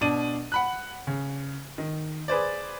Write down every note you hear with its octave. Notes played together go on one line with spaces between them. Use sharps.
B2 D4 D#7
F#5 B5 F#6
C#3
D#3
G#4 B4 C5 D5